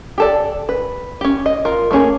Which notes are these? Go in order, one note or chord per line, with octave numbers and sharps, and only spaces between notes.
G4 A4 D5
B4
C#4 G4
D#5
F4 A#4
A3 A#3 C#4 G#4